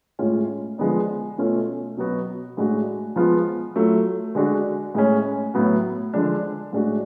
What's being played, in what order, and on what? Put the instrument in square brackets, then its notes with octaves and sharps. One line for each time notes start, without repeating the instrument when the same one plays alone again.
[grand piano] A2 G#3 C#4 F4
D3 F3 G#3 B3 D4
B2 A3 C#4 F4
B2 F#3 B3 F#4
A2 G#3 D4 F#4
F3 G#3 B3 F4
F#3 A3 F4
D3 G#3 D4 F#4
A2 G#3 C#4
A2 F#3 B3 F#4
D3 F3 G#3 D4
A2 G#3 D4 F#4